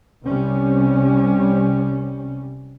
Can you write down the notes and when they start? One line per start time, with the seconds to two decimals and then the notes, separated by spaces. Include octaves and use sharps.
0.24 C2 C3 G3 C#4